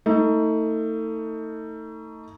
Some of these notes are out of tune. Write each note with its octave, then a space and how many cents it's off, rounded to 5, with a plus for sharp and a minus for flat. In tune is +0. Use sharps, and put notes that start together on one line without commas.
A3 +30 D#4 +30